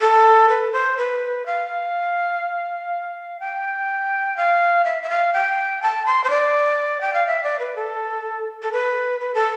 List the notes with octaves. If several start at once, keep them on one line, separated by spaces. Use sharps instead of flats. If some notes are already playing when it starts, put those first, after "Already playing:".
A4
B4
C5
B4
F5
G5
F5
E5
E5
F5
G5
A5
C6
C5
D5
G5
F5
E5
D5
B4
A4
A4
B4
B4
A4